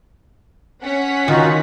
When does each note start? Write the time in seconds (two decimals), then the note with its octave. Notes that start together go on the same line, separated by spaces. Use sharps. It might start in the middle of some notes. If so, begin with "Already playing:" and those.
0.83 C#4 F#5 B6
1.28 D#3 D#4 F4 F#4